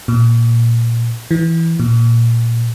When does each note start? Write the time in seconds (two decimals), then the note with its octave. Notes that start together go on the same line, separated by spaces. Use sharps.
0.08 A#2
1.31 E3
1.80 A#2